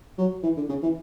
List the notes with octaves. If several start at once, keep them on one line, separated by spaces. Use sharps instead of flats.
F#3
E3
D3
C#3
E3